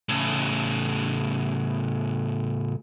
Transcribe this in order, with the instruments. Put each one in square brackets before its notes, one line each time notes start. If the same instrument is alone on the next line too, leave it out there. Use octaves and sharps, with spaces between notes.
[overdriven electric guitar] A2 C#3